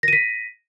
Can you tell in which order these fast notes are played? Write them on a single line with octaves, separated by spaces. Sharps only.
A#6 D#7 B6